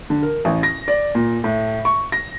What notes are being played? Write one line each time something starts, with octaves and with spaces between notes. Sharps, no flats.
D3
A#4
A1
A#6
D5
A#2
A2
C#6
A#6